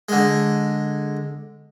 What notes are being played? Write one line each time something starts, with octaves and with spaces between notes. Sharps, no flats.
D3 G#3